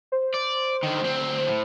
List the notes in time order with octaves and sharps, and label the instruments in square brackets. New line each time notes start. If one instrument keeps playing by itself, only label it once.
[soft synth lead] C5
[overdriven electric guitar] D5
D3 D#3
D2 C4
A2